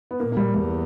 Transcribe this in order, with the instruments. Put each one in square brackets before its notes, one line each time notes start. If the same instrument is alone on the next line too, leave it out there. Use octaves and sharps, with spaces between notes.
[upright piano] B3
[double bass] A#2 [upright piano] A#3
[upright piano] A#3
G3
[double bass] E2 [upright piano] G3